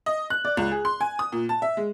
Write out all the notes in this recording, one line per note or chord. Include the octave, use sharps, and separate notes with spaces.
D#5
F#6
D5
C#2
G#4
C6
G#5
D#6
A#2
A5
E5
G#3